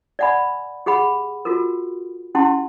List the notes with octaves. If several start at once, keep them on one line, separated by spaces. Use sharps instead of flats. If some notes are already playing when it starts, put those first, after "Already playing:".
D5 E5 F#5 G#5 B5
G4 G#4 F#5 B5
F4 F#4 A4 A#4
C#4 E4 G4 F#5 A5 C6